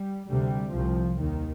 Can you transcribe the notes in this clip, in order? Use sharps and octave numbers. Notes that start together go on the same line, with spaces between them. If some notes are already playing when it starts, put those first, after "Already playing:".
Already playing: G3
D2 C3 G3
C2 C3 F3
D#2 D#3